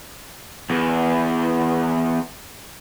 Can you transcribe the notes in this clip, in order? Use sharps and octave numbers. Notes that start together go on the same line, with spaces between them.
E2 E3